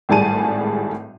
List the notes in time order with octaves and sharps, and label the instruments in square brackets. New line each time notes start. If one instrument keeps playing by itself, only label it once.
[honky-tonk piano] G#1 A2 G3 G#4 A5 D#7